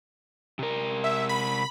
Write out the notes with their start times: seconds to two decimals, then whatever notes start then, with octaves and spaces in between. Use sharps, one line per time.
0.59 C3 A#4
1.04 E5
1.29 B5